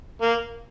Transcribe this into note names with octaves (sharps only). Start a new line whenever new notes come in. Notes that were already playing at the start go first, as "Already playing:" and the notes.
A#3